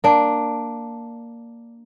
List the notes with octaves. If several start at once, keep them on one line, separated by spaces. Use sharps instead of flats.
A#3 D4